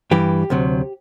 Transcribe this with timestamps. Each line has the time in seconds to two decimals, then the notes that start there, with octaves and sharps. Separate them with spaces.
0.11 G2 E3 G3 G4
0.50 D2 C3 F#3